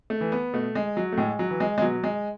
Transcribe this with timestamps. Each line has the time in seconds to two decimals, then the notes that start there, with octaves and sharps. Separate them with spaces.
0.10 A3
0.21 E3
0.32 B3
0.53 B2 A3
0.75 G#3
0.97 F#3
1.12 A3
1.17 A2 G#3
1.39 F#3
1.51 E3
1.60 G#3
1.78 G#3
1.82 B2 F#3
2.04 G#3